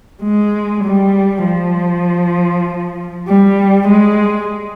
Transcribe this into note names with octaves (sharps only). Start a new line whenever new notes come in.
G#3
G3
F3
G3
G#3